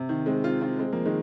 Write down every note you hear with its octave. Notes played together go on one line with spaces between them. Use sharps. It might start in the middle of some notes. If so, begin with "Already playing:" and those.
Already playing: C3
D#3
G#3 C4
C4 F4
C4 F4
G#3 C4
F3 A#3
D#3 G#3